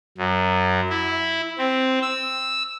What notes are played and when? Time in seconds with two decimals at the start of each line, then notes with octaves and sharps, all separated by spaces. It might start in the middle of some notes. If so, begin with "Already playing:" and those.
0.18 F#2
0.89 E4
1.58 C4
2.02 E6